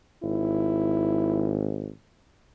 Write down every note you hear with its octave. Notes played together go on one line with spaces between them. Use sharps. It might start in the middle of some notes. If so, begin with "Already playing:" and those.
G#1 E4